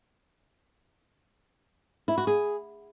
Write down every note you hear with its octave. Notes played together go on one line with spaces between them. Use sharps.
E4
F#4
G#4